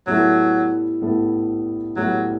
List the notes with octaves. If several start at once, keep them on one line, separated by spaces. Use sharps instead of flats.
A2 F#3 G3 B3 E4 A4
A2 G3 B3 E4 A4
A2 F#3 G3 B3 E4 A4